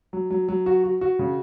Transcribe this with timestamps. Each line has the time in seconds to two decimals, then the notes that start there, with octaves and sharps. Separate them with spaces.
0.13 F#3
0.30 F#3
0.48 F#3
0.66 F#4
0.84 F#4
1.01 F#4
1.19 C#3